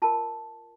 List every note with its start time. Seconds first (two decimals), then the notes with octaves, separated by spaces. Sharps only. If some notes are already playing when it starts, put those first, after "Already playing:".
0.02 F4 A#4 A5